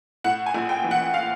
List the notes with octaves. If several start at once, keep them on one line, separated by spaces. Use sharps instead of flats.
A2 F#5
G#5
A#1
G5
E3
F#5
F5